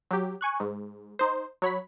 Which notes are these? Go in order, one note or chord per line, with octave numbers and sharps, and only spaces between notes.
F#3 G4
G#5 C#6 F#6
G#2
D#4 C5
F#3 C#5 B5 B6